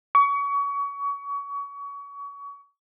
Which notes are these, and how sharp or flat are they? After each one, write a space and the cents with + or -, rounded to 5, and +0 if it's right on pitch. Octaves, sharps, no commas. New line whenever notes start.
C#6 +30